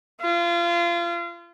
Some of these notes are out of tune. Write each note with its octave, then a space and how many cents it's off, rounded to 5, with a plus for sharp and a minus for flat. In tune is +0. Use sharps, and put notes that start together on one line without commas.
F4 -30